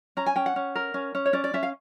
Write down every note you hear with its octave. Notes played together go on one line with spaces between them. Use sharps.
C#4 A#5
G#5
C#4 G5
F#5
C#4
A#4
C#4
C#4
C#5
C#4 D5
D5
C#4 E5
F5